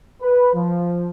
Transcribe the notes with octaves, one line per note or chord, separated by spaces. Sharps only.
B4
F3